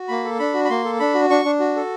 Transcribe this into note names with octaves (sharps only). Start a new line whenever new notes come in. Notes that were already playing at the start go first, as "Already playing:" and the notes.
Already playing: F#4
A#3 B5
A4
D4 B5
F#4
B5
A#3 C6
A4
D4 B5
F#4
D4 C#6
D4
F#4
A4